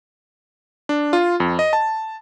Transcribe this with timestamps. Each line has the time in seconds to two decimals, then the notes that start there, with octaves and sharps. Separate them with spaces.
0.89 D4
1.13 F4
1.40 F2
1.59 D#5
1.73 A5